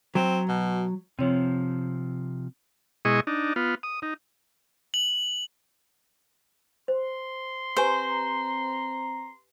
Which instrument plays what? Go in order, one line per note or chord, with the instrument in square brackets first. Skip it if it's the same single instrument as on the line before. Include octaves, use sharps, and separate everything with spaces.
[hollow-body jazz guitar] F#3 [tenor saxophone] C4
[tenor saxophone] B2
[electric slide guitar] C3 F3 [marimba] C4 C#5
[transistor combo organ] B2 G#3 E4 G#4 D#5 C#6
D4 D#4
B3 F4
D#6
D#4
[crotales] F#7
[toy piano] C5 [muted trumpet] C6
[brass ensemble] C4 A#5 [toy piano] G4 B4 G#5 [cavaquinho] C5